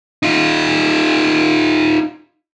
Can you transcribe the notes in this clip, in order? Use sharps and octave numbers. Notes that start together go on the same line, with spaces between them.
D#4 F4